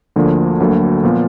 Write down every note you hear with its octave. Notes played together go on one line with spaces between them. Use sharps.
D2 D3 F3 A#3 D4
D2 D3 F#3 A#3
A#2 F3 B3 F4